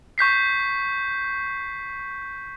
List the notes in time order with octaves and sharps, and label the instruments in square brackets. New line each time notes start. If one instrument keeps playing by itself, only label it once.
[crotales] C#6 G6 B6 C7